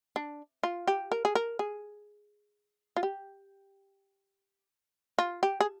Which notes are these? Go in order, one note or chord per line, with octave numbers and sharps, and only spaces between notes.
D4
F4
G4
A#4
G#4
A#4
G#4
F4
G4
F4
G4
G#4